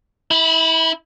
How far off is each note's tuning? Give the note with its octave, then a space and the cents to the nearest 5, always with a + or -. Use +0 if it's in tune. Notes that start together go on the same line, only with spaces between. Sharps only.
E4 -30 B5 +0